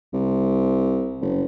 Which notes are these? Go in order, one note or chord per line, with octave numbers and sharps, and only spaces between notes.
C2
F#1